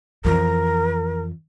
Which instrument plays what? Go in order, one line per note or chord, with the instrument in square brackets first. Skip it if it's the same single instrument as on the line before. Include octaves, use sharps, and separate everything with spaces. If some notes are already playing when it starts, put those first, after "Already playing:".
[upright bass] F2 E3 [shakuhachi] A#4